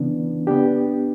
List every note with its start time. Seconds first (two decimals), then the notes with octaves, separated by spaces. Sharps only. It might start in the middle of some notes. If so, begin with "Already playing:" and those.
Already playing: C#3 E3 B3 D4
0.47 B3 D4 G4